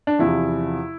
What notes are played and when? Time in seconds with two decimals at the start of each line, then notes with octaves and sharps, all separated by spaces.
0.07 D4
0.19 E2 C3 F3 E4